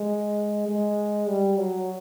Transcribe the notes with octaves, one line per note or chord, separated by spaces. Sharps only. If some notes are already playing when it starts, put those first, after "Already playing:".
Already playing: G#3
G#3
G3
F#3